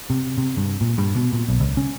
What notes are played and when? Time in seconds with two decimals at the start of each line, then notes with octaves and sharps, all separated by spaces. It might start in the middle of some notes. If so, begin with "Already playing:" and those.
0.10 C3
0.38 C3
0.57 G2
0.81 A#2
0.98 G2
1.16 B2
1.33 A#2
1.48 B1
1.60 C#2
1.77 C#4